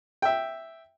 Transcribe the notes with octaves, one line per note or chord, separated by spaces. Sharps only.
E5 G5